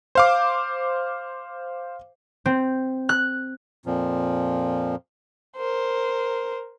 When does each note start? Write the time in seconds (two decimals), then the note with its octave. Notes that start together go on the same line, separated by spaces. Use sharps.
0.15 C5 F5 D6
2.46 C4
3.09 F#6
3.86 F2 A#2 F3
5.57 A#4 C5